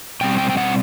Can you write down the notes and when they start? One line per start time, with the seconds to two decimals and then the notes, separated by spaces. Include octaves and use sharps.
0.21 B2 G3 C4 G5
0.38 G5
0.50 G5
0.57 F#5